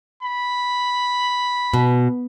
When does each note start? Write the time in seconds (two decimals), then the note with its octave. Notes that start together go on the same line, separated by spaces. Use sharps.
0.23 B5
1.74 B2